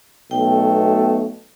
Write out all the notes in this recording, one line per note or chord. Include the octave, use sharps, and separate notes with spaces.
B1 B2 A3 G5